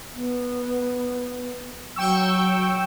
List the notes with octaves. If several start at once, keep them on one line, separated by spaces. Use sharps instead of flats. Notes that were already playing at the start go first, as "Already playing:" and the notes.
B3
F#3 G5 C#6 E6